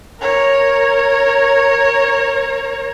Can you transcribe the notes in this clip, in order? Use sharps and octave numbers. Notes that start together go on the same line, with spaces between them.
A#4 C#5